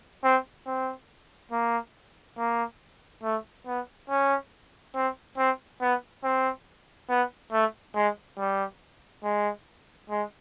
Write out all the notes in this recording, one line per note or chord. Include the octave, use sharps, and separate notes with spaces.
C4
C4
A#3
A#3
A3
B3
C#4
C4
C4
B3
C4
B3
A3
G#3
G3
G#3
G#3